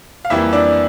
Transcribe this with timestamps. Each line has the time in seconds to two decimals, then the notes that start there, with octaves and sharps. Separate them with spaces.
0.25 F5
0.30 F2 E3 G3 A#3 E4 E5
0.53 D4 D5